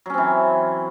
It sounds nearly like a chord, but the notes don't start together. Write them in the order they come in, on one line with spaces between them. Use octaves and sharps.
F#3 C#4 C4 E3